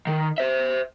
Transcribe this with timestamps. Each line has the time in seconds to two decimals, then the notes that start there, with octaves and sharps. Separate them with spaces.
0.07 D#3
0.38 C5 E5